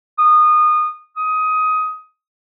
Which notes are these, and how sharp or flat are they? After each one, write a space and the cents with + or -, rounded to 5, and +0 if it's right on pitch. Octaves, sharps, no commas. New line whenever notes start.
D#6 -25
D#6 +15